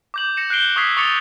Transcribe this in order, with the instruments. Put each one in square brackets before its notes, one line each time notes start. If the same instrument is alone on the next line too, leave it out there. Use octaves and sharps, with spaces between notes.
[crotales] D6 G6 F#7
A#6 C#7 E7
F#6 G6 C7 D7 G7
C#6 D#6 E6 G#6 B6 C7
C#6 D#6 A6 C#7 F7 G7